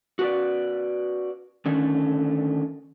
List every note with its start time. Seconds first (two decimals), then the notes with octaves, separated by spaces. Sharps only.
0.19 F#4 B4 D5
1.66 D3 D#3 A3 C#4